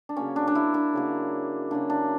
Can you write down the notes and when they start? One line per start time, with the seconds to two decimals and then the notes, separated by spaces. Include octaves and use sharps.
0.09 D4
0.16 C#3 F#3 A#3 C#4
0.36 D4
0.47 D4
0.55 E4
0.74 D4
0.94 C#3 F#3 A#3
1.71 C#3 F#3 A#3 D4
1.90 D4